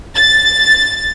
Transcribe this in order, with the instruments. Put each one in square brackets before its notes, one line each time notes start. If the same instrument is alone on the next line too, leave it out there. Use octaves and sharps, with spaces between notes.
[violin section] A6